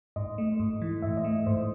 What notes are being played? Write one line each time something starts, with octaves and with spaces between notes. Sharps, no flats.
G#2 D#5
A3
G#2
E3
G#2 E5
D#5
A3
G#2 C5